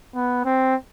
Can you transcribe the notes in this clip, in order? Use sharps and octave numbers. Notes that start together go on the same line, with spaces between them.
B3
C4